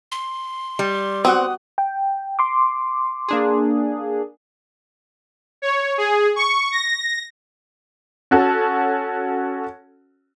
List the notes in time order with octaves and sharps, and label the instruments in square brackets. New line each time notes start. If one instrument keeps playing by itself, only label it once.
[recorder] C6
[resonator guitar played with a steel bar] G3
[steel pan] B3 F#4 F#5 [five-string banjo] C4 [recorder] D#6
[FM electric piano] G5
C6 D6
[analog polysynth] A#3 D4 G#4
[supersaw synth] C#5
G#4
C#6
A#6
[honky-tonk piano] C#4 F#4 A4